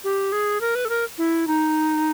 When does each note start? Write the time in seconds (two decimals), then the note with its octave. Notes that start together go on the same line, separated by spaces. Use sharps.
0.04 G4
0.32 G#4
0.61 A#4
0.75 B4
0.85 A4
0.89 A#4
1.18 E4
1.47 D#4